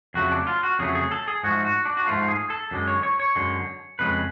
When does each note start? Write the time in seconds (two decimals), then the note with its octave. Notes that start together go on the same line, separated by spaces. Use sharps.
0.14 F2 C#3 F#3 A3 F#4
0.31 D4
0.47 F4
0.63 F#4
0.79 F2 C#3 F#3 A3 G#4
0.95 G#4
1.11 A4
1.28 G#4
1.43 G#2 F3 A3 F#4
1.65 F#4
1.85 D4
1.97 F#4
2.07 G#2 F3 A3 F4
2.28 G#4
2.50 A4
2.71 F#2 D3 G#3
2.88 C#5
3.03 C#5
3.20 C#5
3.36 F#2 D3 G#3
3.99 F2 C#3 G#3 B4